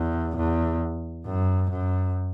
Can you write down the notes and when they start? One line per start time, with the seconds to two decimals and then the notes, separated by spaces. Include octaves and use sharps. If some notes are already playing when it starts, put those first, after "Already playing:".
Already playing: E2
0.37 E2
1.26 F#2
1.71 F#2